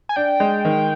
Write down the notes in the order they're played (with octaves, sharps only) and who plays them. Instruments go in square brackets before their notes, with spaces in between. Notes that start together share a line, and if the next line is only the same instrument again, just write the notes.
[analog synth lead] G#5
[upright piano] D4 [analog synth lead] G5
[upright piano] G#3
D#3